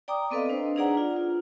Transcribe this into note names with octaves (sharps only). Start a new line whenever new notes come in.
D5 G5 A#5 D6 D#6
B3 C4 A4 B4 D#5 F5
D4 B4 C5
D4 D#4 G#4 D5 F#5 A#5
F4
F4